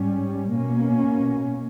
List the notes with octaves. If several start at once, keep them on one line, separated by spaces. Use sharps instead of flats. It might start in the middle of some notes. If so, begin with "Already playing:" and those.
Already playing: G#2 G3 C#4
B2 A#3 C#4